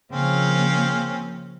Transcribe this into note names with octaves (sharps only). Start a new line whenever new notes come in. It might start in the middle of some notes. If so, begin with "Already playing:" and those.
C#3 F3 A#3 C4 C#4 F5